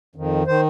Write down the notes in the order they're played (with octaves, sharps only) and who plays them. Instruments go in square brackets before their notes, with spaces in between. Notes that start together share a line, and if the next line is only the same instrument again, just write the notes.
[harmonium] F2 D#3
D#3 C5